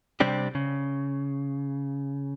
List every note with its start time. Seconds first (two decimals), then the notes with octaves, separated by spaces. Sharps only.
0.20 C3 G3 C4 D4 G4
0.55 C#3